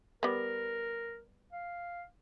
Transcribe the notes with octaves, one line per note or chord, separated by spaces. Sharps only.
G3 B3 A#4
F5